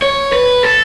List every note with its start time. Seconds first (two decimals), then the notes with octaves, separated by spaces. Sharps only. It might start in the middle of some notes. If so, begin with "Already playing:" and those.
0.02 C#5
0.33 B4
0.63 A4